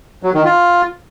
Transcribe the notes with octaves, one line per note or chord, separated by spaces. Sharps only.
F#3
D#3
F4